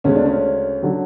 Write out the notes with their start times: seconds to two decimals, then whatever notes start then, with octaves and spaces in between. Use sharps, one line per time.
0.04 D2 C#3 G#3 C#4
0.16 D4
0.25 C#4
0.82 D3 F#3